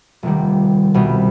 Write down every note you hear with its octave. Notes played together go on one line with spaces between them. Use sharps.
F1 D#2 D#3 G3
C2 B2 G3 B3